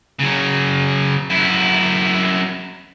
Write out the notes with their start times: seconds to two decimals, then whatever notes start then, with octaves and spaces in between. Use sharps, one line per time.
0.19 C#3 F#3
1.30 F#2 E4